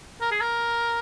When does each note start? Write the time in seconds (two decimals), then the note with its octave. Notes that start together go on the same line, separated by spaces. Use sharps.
0.21 A#4
0.31 G#4
0.41 A#4